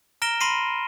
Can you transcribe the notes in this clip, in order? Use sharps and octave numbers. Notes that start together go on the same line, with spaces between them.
A#5 F6 A#6 D7 E7 G7
B5 C6 A#6 C7 D#7